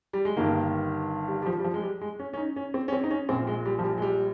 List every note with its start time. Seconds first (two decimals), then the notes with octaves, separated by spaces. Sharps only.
0.13 G3
0.25 G#3
0.36 G1 G2 D#3 A#3
1.28 G3
1.42 G3
1.46 F3
1.59 G3
1.64 F3
1.74 G#3
1.83 G3
2.01 G#3
2.19 C#4
2.33 C#4
2.37 D#4
2.56 C#4
2.74 C4
2.88 C#4
2.92 C4
3.04 D#4
3.10 C#4
3.29 A#1 C4
3.32 A#2
3.47 G#3
3.65 G3
3.79 F3
3.84 G3
3.98 G#3
4.02 G3